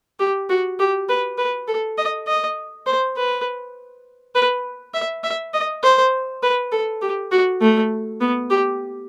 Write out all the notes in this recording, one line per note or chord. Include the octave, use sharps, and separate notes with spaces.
G4
F#4
G4
B4
B4
A4
D#5
D#5
C5
B4
B4
E5
E5
D#5
C5
B4
A4
G4
F#4
A3
B3
G4